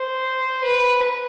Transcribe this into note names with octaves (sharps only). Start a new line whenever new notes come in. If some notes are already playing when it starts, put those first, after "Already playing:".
Already playing: C5
B4